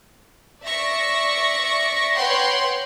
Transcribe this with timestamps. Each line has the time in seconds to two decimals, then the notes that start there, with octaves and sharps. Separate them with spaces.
0.64 D5 E5 C#6 A#6
2.15 B4 C#5 F#5 G5 C6